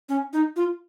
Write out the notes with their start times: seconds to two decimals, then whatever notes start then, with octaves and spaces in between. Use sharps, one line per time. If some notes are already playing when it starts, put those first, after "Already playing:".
0.09 C#4
0.33 D#4
0.56 F4